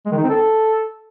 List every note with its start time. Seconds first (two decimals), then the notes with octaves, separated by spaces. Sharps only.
0.06 G#3
0.12 D#3
0.18 D#4
0.24 C4
0.30 A4